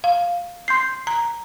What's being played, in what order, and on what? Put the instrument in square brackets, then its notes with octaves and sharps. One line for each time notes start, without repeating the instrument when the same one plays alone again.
[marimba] F5
[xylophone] C6 G6 C7
[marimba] A#5